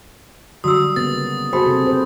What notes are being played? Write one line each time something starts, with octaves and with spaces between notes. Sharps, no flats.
D3 F#3 G3 F#4 D#6 E6
C#3 A#3 B3 A6
F#4 G#4 A4 C5 G5 B5
C3 G4
B4 C5